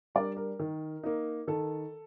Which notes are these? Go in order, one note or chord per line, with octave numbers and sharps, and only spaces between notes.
G3 D4 A#4 D5
A#4
D#3
A#3 D#4
D#3 A4